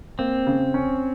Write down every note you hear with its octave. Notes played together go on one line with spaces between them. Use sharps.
A#3 C4
C#3
C#4